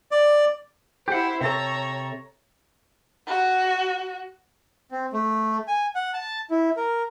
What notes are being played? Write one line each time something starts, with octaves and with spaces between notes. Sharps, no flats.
D5
E4 G4 C5 F#5
C3 A4 C#5 A#5
F#4
C4
A3
G#5
F#5
A5
E4
A#4